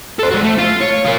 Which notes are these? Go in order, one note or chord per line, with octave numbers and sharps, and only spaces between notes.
A4 C5
G#3 F#4
A3
F4
C#5
F4 A#4